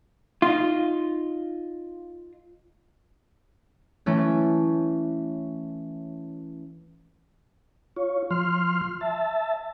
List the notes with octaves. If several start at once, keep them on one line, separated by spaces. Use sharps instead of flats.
D#4 F4
E3 A3 C#4
F4 C#5
F3 C6 F6
E5 A5